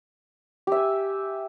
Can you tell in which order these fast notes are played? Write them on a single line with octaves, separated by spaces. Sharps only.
G4 E5 G#5